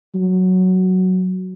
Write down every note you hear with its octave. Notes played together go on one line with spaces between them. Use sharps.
F#3